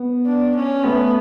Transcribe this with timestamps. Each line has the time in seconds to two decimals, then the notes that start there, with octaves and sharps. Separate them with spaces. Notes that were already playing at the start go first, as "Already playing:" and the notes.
Already playing: B3
0.26 D4
0.55 C#4
0.84 A3 B3